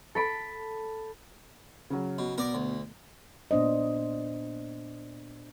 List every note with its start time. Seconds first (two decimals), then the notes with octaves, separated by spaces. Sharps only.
0.15 A4 B5 D7
1.90 C#3 F#3
2.18 B2
2.38 B2 A#4 D5 A#5
2.54 D2
3.51 A#2 B3 D4 C5 D#5